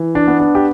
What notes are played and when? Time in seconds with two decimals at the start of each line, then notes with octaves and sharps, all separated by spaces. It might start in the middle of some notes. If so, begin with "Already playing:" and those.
Already playing: E3
0.15 D4
0.28 B3
0.40 D4
0.55 G4